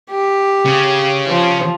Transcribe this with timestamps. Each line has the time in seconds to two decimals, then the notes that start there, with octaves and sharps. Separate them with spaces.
0.11 G4
0.65 C#3
1.28 F3